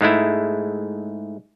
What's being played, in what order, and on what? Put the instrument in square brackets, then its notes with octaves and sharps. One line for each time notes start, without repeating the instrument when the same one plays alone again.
[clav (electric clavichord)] G#2 G#3 A3 E4